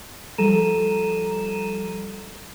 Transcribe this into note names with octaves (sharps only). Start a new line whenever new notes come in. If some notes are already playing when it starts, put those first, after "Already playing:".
F3 G3 A4 A#5 D#7 E7